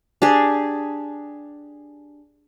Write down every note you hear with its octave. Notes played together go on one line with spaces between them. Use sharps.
D4 G4 G#4